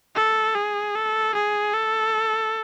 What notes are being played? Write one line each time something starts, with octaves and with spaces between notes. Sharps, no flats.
A4
G#4
A4
G#4
A4